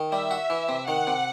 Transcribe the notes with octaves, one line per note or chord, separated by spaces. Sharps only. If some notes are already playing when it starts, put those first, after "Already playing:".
Already playing: D#3
G3 E5
F#4
E3
C3
D#3 F#5
C3